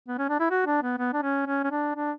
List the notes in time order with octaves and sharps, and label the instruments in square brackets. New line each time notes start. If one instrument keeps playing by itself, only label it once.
[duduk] B3
C#4
D4
E4
F#4
D4
B3
B3
D4
C#4
C#4
C#4
D4
D4